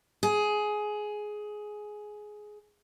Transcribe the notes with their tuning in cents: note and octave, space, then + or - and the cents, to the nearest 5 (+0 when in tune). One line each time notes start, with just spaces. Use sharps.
G#4 +15